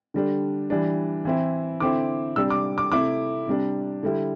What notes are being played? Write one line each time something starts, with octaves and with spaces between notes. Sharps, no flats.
D3 G3 D4
E3 G3 D4
E3 C4 E4
D3 C4 E4 D6
C3 G3 D4 E6
D6
D6
C3 A3 E4 D6
C3 G3 D4
D3 G3 E4